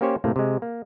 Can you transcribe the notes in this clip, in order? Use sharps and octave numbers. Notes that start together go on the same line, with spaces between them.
A#3 C#4 G4 C5 C#5
A2 C3 A3 A#3
C3 G#3
A#3